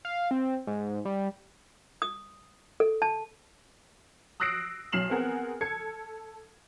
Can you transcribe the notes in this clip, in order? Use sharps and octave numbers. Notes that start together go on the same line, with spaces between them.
F5
C4
G#2
G3
D#6
A4
A5
D#6 E6 F#6 A#6 C7 D7
B1 F#3 F6 C7 E7 F#7
B3 C4 G#4 A#4 F#5
A4 G#6 C#7